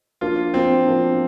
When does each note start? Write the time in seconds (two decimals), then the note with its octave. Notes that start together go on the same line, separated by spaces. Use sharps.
0.21 F3 A#3 D4 F4
0.54 F3 A#3 C4 D4
0.87 F3 A#3 D4